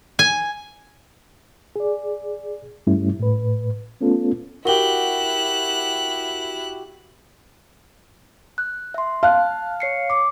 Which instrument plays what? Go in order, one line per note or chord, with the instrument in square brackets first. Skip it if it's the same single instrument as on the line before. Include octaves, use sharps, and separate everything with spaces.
[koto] G#5
[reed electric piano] G#4 D5
G2 G3 A3 C#4 E4
A2 B4
A3 B3 C#4 F4 A4
[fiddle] E4 F#6 [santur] F#4 G4 [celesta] A#4 G7
[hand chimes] F#6
E5 C6
[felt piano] F5 [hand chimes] A5 F#6
[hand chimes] C#5 C7 C#7
D6